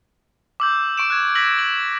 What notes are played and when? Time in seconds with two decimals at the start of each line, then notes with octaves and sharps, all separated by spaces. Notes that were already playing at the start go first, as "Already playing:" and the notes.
0.60 D6 E6 G6
0.98 C#6 D7 E7
1.10 F#6 G#6
1.35 E6 F#6 G#6 A#6 B6 F#7
1.59 F#7